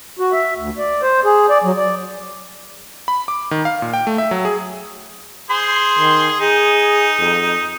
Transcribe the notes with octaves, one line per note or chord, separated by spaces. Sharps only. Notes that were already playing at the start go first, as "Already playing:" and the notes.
F#4
E5
D2
D5
C5
G#4
D5
F#3
D5
B5
D6
D#3
F5
A#2
G5
A3
E5
F#3
G#4
G#4 C5 C6
D#3
D#4 G#4
F2